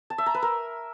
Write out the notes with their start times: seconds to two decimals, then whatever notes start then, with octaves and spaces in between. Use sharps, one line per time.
0.10 A5
0.18 E5
0.26 A#5
0.34 B4
0.42 A#4